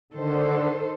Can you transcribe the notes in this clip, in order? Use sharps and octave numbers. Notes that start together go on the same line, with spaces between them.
D3 D#3 A4 C5